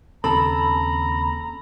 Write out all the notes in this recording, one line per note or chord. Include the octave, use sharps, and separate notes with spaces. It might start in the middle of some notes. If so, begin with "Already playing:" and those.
D#2 C#3 C4 A4 A#5 B5